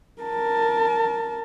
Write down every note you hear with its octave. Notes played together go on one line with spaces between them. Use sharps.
A#4 A5